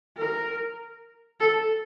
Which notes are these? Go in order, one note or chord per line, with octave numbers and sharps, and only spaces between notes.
A#4
A4